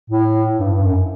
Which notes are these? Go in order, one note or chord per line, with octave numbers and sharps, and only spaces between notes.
A2
G2
G2
F#2